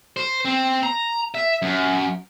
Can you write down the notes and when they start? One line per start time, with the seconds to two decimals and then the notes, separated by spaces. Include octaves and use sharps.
0.17 C5
0.45 C4
0.83 A#5
1.35 E5
1.62 F#2